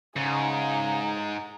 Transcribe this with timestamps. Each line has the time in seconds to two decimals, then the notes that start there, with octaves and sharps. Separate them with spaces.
0.16 G#2 C#3 G#4 A#5